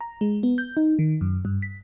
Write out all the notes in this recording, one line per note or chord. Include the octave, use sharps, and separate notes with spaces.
A#5
G#3
B3
G6
D#4
D#3
F#2
G2
B6